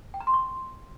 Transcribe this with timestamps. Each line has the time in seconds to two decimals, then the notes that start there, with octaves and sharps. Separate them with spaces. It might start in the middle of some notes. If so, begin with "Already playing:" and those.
0.14 G5
0.20 A#5
0.27 C6
0.33 C#6